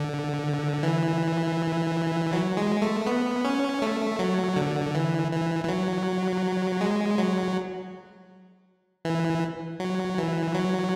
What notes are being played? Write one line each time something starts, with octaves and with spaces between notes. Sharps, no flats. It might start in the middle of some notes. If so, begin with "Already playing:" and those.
Already playing: D3
E3
F#3
G#3
A3
B3
C#4
A3
F#3
D3
E3
E3
E3
F#3
G#3
F#3
E3
F#3
E3
F#3